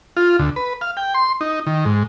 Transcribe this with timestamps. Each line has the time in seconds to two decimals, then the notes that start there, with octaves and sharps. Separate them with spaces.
0.17 F4
0.39 D2
0.56 B4
0.81 F5
0.97 G5
1.14 C6
1.41 D#4
1.66 D#3
1.85 G#2